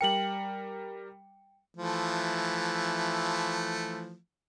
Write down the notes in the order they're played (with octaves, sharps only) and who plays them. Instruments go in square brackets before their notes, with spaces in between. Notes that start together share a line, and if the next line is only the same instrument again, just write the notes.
[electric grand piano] G3 A#4 C#7 [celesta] G5 F#7
[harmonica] E3 F3 A3